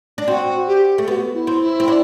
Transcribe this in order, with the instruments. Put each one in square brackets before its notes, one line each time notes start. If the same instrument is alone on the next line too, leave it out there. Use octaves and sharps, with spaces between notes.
[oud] D4
[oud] C4 [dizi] F#4
[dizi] G4
[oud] A3
[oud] B3 [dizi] F#4
[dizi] E4
[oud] C4
[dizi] E4
[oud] C4
D4